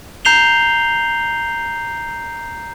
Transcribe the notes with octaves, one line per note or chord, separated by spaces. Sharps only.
A#5 G6 C7 F7 G7